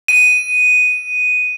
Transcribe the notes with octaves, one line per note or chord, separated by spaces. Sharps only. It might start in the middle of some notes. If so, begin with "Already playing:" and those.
D#7